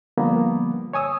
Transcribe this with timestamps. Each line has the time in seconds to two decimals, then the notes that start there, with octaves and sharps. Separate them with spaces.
0.17 D3 F3 G3 A#3 B3
0.93 C#5 G#5 D#6 E6